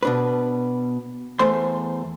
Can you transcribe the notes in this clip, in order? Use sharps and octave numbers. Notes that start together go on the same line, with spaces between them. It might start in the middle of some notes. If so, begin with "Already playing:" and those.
B2 D4 B4
E2 A3 C5 C6